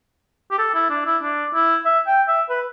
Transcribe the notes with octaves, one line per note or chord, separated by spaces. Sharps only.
G4
A4
E4
D4
E4
D4
E4
E5
G5
E5
B4